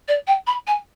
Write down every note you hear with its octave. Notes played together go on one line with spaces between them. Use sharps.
D5
G5
B5
G#5